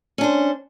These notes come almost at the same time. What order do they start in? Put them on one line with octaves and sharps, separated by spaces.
C#4 D4 C5